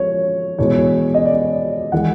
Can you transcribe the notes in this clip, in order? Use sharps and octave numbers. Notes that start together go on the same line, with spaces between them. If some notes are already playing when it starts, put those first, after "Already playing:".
Already playing: F3 G#3 C#5
E2 B2 G#3 C#5
D#5
D5
E3 G#3 F#5